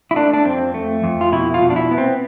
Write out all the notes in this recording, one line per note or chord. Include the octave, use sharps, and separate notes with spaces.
E4
A3 D4
D4
F2 C4
A3
F2
F4
B2 E4
F4
B2
D4
E4
B3
C4